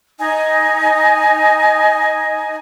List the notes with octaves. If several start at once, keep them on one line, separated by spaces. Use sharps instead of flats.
D#4 D#5 G#5